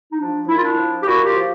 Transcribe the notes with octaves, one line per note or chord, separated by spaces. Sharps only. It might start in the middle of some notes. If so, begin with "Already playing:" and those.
D#4
F3 D4
A#2 E4
F4
D4 E4
F3
G4
A#2 E4 F#4
F4 G4
F3